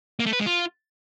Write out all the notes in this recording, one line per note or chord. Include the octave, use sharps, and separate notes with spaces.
A#3
A3
B4
G#3
F4